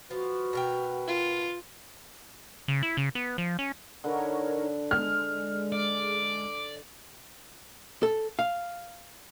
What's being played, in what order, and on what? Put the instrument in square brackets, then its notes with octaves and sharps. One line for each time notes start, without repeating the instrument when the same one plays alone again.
[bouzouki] F3 [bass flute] F#4 [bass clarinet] B4
[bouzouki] B2 A#4 G5
[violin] F4
[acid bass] C#3
E4
C#3
B3
F3
C#4
[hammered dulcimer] D3 B5 [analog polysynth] D#4 A#4 C#5
[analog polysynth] G#3 [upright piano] F6
[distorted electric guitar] D5
[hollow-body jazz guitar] A4
F5